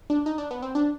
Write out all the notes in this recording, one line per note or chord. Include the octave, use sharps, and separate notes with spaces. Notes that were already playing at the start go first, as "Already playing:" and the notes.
D4
D#4
D4
B3
C4
D4